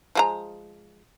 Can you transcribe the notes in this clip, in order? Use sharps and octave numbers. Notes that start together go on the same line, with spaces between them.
F3 G#3 A#5